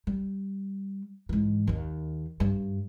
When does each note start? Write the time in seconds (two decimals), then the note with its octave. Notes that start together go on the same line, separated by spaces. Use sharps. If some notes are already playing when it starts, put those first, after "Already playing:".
0.07 G3
1.29 G#2 E3
1.67 D#2 D#3
2.40 G2